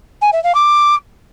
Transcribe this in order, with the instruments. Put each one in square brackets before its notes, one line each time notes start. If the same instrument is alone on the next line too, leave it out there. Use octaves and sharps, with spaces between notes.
[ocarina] G#5
E5
F5
D6